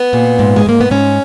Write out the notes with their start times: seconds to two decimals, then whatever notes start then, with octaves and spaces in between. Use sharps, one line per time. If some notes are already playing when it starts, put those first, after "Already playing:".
Already playing: B3
0.13 A#2
0.39 G#2
0.56 G#3
0.66 G#2 A#3
0.80 B3
0.91 G#2 C#4